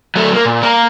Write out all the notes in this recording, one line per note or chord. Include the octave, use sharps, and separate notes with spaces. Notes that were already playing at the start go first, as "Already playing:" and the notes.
F#3 A3
A#3
A#2
A#3 A#4